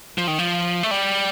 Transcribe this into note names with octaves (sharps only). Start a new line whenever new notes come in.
F3
D#3
F3
A3
G3